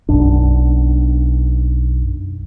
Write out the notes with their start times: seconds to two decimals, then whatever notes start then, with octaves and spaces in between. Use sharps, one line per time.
0.09 B1 F#2 D4